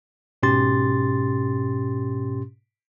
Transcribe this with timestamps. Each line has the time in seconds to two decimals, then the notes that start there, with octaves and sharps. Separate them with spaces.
0.43 G#2 B2 C#4 G4 C6 A6